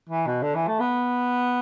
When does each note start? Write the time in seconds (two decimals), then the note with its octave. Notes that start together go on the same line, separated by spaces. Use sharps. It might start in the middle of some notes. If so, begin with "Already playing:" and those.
0.09 E3
0.26 B2
0.42 D3
0.55 E3
0.67 A3
0.79 B3